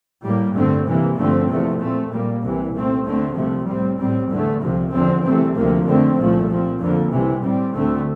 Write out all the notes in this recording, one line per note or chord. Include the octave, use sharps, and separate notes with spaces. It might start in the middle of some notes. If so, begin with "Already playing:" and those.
A2 G3 A#3
G2 D3 A3 C4
C2 C3 E3 A#3
G2 D3 F3 A3 C4
E2 C3 F3 A3
A#2 A3 C4
A#2 G3 A#3
C2 C3 E3
A#2 A3 C4
D2 D3 A3 C4
C2 C3 F3 A3
A2 G3 C4
A2 G3 C4
E2 D3 A3
C2 C3 F3
E2 D3 F3 C4
C2 C3 E3 A3 C4
D2 C3 F3 A#3
F2 D3 A3 C4
C2 A#2 F3 A3
A#2 F3 C4
F2 D3 F3 A#3
C2 C3 E3
A2 G3 C4
D2 D3 A3 C4